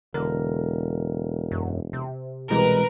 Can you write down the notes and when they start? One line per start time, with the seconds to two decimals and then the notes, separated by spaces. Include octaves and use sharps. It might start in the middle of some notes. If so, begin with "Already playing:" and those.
0.14 E1 D3 A#4
1.51 F#2
1.93 C3
2.50 C2 B2 E3 G3 G#3 A#4 B4